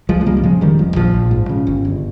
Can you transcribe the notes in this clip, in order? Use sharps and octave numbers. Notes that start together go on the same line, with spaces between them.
C#2 F3 G#3
G#3
C#3 G3 A#3
A#3
C#3 F3 G#3
F1 D#3 G3
F1 F3
A#1 F3
A#1
G#2
C#3
G1
G1